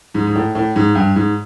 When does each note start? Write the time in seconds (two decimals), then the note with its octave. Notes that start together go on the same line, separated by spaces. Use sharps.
0.14 G#2
0.27 G#2
0.35 A2
0.55 A2
0.76 G#2
0.95 G2
1.16 G#2